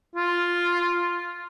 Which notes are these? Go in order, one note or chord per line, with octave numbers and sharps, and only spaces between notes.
F4